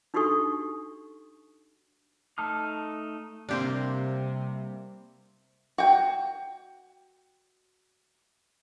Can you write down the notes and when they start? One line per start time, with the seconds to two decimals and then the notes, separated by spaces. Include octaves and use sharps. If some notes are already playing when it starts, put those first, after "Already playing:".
0.14 D4 D#4 F#4 G4 A4 C#6
2.38 A3 D#4 A5 D#6 F6
3.49 C3 G3 A#3 C4 D4 G4 C5
5.78 F#4 G5